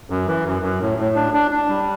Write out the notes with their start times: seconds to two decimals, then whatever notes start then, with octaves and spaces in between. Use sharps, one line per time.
0.10 F#2
0.28 E3
0.46 F#2
0.62 F#2
0.81 A2
0.98 A2
1.16 D4
1.34 D4
1.51 D4
1.69 G3